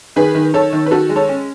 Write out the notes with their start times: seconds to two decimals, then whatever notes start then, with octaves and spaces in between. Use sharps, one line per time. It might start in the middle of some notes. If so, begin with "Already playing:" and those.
0.16 D#3 G#4 B4
0.35 D#3
0.54 D#3 A4 C#5
0.73 D#3
0.86 B4
0.91 D#3 F#4 A4
1.09 G#3
1.16 A4 C#5
1.29 C#4